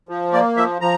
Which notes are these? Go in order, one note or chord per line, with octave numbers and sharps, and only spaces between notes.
F3
A#3 D5
F3 E5
F3 A#5